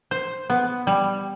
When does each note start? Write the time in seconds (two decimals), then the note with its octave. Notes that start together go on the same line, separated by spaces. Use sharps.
0.11 C5
0.50 B3
0.87 G3